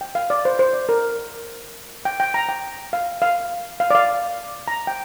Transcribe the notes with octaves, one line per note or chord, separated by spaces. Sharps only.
G5
F5
D5
C5
C5
D5
A#4
G5
G5
A#5
G5
F5
F5
F5
D5
F5
A#5
G5